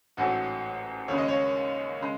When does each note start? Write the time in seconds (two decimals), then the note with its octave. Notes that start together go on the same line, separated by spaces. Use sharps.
0.17 A1 G#2 F#3 A3 F#4
1.08 D#2 C#3 G#3 C#5
1.18 D#5
1.28 C#5
2.01 C#3 G#3